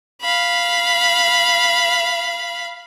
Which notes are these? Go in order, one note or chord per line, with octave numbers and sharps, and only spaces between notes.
F5 B5